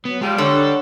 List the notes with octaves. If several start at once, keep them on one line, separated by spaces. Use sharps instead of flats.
F#3 B3
G3 G#3 F4 A5
D3 A4 C#5 F#5